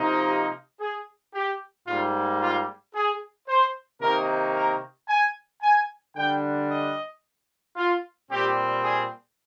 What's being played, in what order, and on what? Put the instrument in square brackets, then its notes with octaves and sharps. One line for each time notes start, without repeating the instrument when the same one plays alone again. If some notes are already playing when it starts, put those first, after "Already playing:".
Already playing: [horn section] C3 F3 A#3 D#4
G4
G#4
G4
G#2 G3 A#3 F4
F4
G#4
C5
C3 D#3 A#3 D#4 A#4
A#4
G#5
G#5
D3 G3 D4 G5
D#5
F4
A#2 G3 C4 G4
G#4